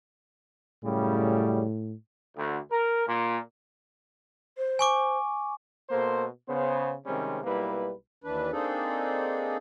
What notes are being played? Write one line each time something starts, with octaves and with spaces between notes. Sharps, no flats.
F#2 A2 C#3 G3
D2
A#4
A#2
C5
G#5 C#6 D6
B2 A#3 A4 C5
C#3 B3 C5
C3 D#3 G3 G#3 C4 C#4
B1 G3 A#3 E4 B4
D#2 E3 D4 B4
A#3 C4 D4 D#4 G#4 A4